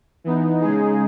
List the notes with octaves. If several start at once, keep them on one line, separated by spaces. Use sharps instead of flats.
E3 B3 D#4
C#3 G#3 D#4 G#4